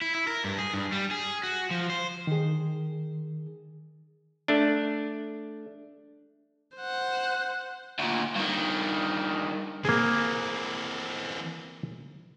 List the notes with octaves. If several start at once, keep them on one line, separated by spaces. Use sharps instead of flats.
E4
E4
A#4
G2
G#4
G2
G3
G#4
F#4
F3
C5
D#3 G#4
A3 D4
C5 F#5
D2 A#2
G2 D#3
E3 A#3 C4 G#4